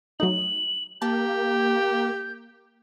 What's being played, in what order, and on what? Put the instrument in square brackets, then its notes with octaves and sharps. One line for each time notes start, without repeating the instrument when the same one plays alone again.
[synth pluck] F#3 A3 D#4 [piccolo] F#7
[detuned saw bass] A#3 [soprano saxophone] G4 [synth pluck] A5 [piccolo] G6